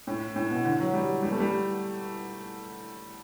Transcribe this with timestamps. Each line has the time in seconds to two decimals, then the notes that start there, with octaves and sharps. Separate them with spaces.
0.07 A2
0.36 A2
0.51 B2
0.65 D3
0.80 F#3
0.93 G3
1.23 G3
1.32 A3
1.40 G3